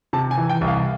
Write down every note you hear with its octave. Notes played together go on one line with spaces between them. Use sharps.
C3 A5
G#5
E3
G5
C2
F5